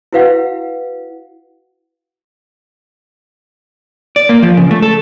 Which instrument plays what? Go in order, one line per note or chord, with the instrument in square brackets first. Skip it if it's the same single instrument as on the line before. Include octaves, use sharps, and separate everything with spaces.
[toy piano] E4 F#4 B4 F5 F#5
[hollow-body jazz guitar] D5
A#3
F3
C#3
A3
A4